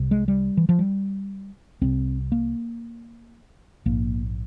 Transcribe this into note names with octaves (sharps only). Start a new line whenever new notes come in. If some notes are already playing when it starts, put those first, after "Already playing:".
Already playing: C2 C3
G#3
G3
E3
F3
G3
C2 C3 C4
A#3
A#1 G#2 A#3